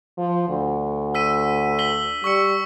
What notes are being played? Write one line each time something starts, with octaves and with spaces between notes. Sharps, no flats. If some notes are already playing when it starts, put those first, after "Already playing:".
F3
D2
E6 B6 D#7
B6 F#7 G7
G3 C#6 E6 C#7